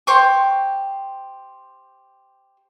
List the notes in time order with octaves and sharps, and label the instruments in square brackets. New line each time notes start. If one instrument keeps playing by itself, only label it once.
[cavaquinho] G4 C5 C#6